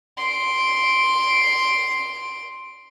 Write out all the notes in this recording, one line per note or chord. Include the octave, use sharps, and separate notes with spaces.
C6 D7